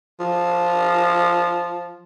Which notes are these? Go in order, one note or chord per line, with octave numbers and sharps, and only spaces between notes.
F3